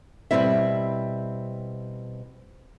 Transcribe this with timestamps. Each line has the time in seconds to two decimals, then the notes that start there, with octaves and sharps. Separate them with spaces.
0.31 B2 G3 G#3 C4 E4 E5